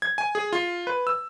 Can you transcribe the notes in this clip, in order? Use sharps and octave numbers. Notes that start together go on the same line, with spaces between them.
G#6
G#5
G#4
F4
B4
E6